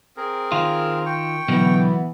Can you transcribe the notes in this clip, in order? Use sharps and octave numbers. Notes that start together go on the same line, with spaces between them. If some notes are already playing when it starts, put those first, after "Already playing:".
C4 G#4 A#4
D#3 F4
G5 C#6
B2 D3 E3 F#3 B3